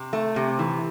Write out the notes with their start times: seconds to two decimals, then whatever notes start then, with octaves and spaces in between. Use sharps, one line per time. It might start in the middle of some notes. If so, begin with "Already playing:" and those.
Already playing: C3
0.13 A3
0.36 C3
0.59 E3